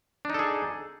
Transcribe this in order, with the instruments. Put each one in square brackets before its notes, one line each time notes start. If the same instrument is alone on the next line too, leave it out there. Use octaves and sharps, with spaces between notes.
[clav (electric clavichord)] D4
D#4
A4
G#4